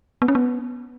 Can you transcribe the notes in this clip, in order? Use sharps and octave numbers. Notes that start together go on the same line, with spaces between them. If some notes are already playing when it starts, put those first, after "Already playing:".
B3
C#4
B3